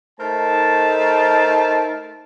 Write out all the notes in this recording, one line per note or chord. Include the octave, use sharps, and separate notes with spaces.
A3 D#4 A#4 C5 A5